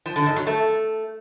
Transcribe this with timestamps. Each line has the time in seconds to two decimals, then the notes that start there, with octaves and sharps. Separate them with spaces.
0.06 F3
0.16 D3
0.26 G#2
0.36 F#3
0.47 A3